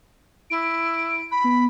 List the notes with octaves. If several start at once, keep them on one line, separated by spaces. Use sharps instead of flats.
E4 D7
B5
B3